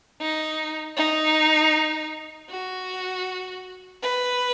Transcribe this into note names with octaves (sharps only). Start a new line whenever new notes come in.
D#4
D#4
F#4
B4